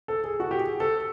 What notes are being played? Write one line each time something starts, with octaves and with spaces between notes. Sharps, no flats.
A4
G#4
F#4
G4
G#4
A4